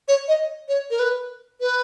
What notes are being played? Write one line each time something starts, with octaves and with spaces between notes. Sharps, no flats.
C#5
D#5
C#5
A#4
B4
B4